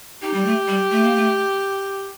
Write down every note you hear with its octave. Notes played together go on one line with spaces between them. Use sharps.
D#4 G4
G3
A3
G3
A3
A#3
A3